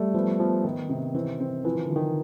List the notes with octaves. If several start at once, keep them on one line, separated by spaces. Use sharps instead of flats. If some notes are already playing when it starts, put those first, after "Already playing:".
Already playing: G3 A3
F3 B3
F3 B3
D#3
C3
E3 C4
C4
E3 F3
D#3
D3
F3
D#3